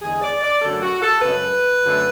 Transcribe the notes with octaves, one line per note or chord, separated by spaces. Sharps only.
E2 D3 G#3 G#4
D5
D5
F#2 D3 F#3 A3 A4
F#4
A4
F#2 C#3 G#3 B4
F#2 D3 A3